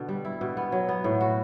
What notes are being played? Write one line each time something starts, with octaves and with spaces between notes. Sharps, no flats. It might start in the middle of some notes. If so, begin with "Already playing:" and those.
Already playing: B2 D3
G3
E4
B2
B3
F#3
B3
A2
F#4